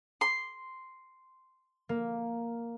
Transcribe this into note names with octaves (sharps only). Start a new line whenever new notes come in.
C6
A#3